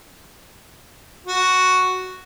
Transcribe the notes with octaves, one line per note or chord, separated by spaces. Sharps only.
F#4